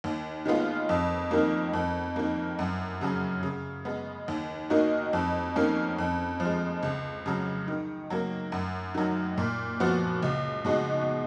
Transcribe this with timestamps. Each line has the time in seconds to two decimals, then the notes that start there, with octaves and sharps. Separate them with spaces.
0.04 D#2
0.46 D#3 G#3 B3 F4
0.89 F2
1.31 D#3 A#3
1.73 F2
2.16 D#3 A#3
2.59 F#2
3.01 C#3 F#3 C#4
3.43 C#3
3.85 G#3 B3
4.28 D#2
4.70 D#3 A#3 D#4 F#4
5.13 F2
5.56 D#3 A#3 C#4
5.98 F2
6.40 F3
6.45 G#3
6.83 C#2
7.26 C#3 F#3
7.68 D#3
8.10 F#3 A#3
8.52 F#2
8.95 D#3 F#3
9.38 A#2
9.80 F3 B3 F#4
10.23 C#2
10.65 B2 G#3 D#4 F#4